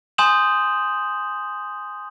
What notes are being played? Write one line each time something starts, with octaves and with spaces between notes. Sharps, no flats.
G#5 C6 D#6 G6 E7 F#7